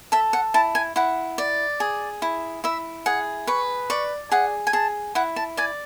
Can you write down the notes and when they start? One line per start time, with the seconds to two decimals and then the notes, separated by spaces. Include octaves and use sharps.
0.12 A4 E5
0.33 F#5
0.54 E4 A5
0.75 G#5
0.96 E4 F#5
1.38 D5
1.80 G#4
2.22 E4
2.64 E4 E5
3.06 G#4 F#5
3.47 B4 C#6
3.90 D5 C#6
4.32 G#4 F#5
4.67 G#5
4.73 G#4 A5
5.15 E4 F#5
5.36 A5
5.57 D5 G#5